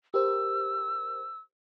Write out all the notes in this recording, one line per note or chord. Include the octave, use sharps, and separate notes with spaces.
G4 A#4 C5 E6